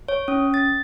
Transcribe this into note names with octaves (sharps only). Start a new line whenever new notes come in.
C#5
C#4
A6